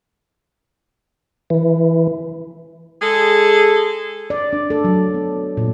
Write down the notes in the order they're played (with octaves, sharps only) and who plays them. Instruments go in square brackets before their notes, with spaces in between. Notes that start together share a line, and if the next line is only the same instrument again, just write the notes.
[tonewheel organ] E3
[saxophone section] G#3 G#4 A4
[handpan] D5
D4
A4
F#3
B3
A#2